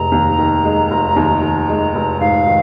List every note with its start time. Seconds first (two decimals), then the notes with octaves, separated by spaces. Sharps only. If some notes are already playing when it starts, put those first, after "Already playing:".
Already playing: F1 G#3 A#5
0.12 D#2
0.39 D#3
0.65 G#3
0.91 F1
1.16 D#2
1.43 D#3
1.69 G#3
1.95 F1
2.20 G#2 F5
2.47 D#3